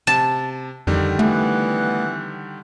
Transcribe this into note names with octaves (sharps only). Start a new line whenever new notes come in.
C3 A5
F2 D3 D#3 G3
E3 A3 B3 F#5